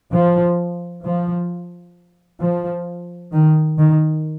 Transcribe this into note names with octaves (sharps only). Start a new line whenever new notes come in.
F3
F3
F3
D#3
D#3